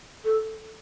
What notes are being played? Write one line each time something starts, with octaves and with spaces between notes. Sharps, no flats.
A4